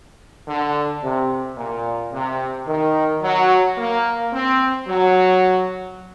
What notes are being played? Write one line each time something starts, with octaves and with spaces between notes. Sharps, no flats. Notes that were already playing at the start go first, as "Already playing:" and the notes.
D3
C3
A#2
C3
D#3
F#3
A#3
C4
F#3